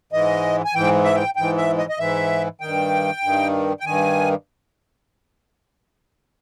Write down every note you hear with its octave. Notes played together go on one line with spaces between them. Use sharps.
G#2 E3 D#5
G#5
G#2 E3 G5
E5
G5
G#2 E3 G5
E5
D#5
D#5
G#2 E3 E5
G2 D#3 G5
G2 D#3
G5
G2 D#3 G#5